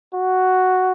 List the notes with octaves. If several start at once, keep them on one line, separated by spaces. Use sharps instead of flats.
F#4